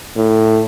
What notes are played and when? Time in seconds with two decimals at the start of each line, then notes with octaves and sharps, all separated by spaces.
0.16 A2